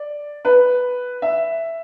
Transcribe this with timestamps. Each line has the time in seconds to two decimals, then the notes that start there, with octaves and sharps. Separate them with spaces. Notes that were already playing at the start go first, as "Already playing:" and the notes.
Already playing: D5
0.45 B4
1.22 E5